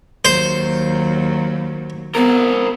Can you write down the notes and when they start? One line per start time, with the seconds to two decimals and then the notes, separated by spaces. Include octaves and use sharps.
0.25 D#2 F#3 C5
2.15 B3 C4 A#4